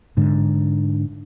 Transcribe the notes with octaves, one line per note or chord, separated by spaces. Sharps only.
G#2 D3